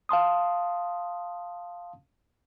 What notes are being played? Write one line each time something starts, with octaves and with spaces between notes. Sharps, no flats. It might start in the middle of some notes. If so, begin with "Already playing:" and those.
F5 A5 C6 D#6